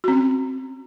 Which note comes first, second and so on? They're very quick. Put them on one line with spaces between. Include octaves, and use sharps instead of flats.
F#4 C4 C#4